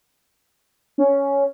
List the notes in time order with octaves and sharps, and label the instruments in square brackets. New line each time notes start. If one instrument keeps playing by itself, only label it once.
[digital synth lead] C#4